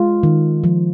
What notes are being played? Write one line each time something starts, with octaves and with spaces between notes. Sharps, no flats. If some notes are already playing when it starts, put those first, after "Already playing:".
Already playing: G#3 F4
D#3
F3